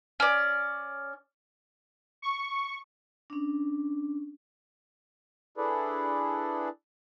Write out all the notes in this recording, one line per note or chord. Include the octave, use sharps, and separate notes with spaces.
C#4 D5
C#6
C#4 D4
D4 E4 G#4 A4 B4 D5